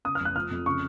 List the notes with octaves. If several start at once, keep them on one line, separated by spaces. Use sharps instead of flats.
C#3 D#6
F6
F1 F#6
F3 F6
F2
C#3 C#6